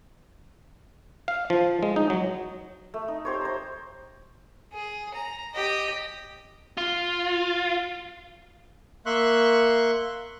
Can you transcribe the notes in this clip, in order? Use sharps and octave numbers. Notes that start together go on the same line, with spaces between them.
F5
F3
G#3
D#4
F#3
A3
D#4
G4 C5 C#5
C5 A#5
G#4
A#5
G4 D#5
F4
A#3 E5 C6 C#6 F#6